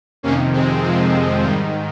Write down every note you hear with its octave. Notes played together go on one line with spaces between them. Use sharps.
F2 C3 D#3 A#3 C#4
G#3 C4
F3 G#3
F3
G#2 D#3 G3